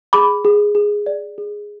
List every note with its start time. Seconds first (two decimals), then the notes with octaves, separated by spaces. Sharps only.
0.13 G#4 B5 D6
0.45 G#4
0.75 G#4
1.06 D5
1.38 G#4